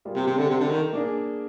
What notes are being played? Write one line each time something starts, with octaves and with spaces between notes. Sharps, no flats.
G3 A#3 F4 G#4
C3
C3
D3
C3
D3
D#3
A#3 D4 G#4